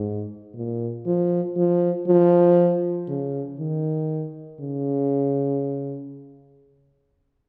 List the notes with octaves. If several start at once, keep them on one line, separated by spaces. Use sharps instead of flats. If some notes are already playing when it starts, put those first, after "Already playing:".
Already playing: G#2
A#2
F3
F3
F3
C#3
D#3
C#3